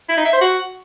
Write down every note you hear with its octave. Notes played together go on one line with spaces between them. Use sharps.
E4
D#4
E5
C5
F#4